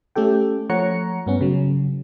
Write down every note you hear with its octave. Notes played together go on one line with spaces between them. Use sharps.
A3 C#4 G4 A4 G5
F3 A3 C#5 F#5 A#5 C#7
G2 B3 C#4
C#3 F#3